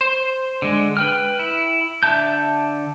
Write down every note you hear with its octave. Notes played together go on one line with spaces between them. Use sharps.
C5
D3 G#3
B4 G5 F6
E4
D3 E5 A5 G6